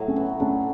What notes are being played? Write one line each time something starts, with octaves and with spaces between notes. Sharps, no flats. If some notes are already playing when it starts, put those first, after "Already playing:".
Already playing: A2 F#3
A3 C#4
B3
A3 C#4 D4